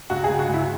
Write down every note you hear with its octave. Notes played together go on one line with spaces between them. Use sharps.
C#2 F#4
G#4
C#2
F#4
C#2 E4